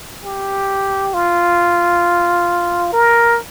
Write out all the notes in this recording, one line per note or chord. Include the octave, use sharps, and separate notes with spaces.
G4
F4
A#4